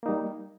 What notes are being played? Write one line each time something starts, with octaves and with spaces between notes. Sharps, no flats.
G3 A#3 D#4